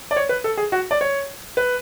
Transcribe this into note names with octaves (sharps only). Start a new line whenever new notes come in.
D5
C#5
B4
A4
G#4
F#4
D5
C#5
B4